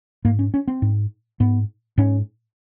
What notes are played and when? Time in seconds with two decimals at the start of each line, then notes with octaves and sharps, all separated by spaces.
0.25 G#2 A#3
0.39 C#4
0.54 C#4
0.68 C4
0.82 G#2
1.40 G#2 B3
1.98 G#2 C#4